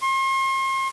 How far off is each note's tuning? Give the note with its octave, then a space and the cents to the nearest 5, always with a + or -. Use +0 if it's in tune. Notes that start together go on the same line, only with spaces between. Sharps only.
C6 +40